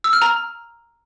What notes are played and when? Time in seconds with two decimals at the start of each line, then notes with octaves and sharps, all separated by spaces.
0.04 E6
0.13 F6
0.22 A#5